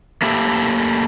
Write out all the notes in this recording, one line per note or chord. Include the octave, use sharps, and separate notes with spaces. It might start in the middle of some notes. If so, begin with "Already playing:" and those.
A3 A#3 E4 G4 A4